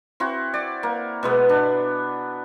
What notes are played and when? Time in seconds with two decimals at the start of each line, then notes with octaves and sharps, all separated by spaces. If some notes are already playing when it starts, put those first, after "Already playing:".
0.20 C4 E4 F#4
0.54 D5
0.83 A#3
1.23 B2 G#3 B3
1.49 D4